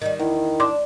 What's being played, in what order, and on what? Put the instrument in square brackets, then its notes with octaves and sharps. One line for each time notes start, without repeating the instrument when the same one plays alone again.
[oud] D#3 G3 [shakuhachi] D#5
[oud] E2 [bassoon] D#3 [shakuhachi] E4
[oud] D4 [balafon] C6 D6